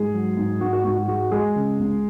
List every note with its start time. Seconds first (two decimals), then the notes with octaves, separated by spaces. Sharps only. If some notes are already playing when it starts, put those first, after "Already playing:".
Already playing: G#2 G#3 G#4
0.13 F#3
0.37 G#2
0.61 G#2 F#4
0.73 F#4
0.84 G#2 F#4
0.96 F#4
1.08 G#3 F#4
1.31 G#3 G#4
1.56 C#3
1.79 C#2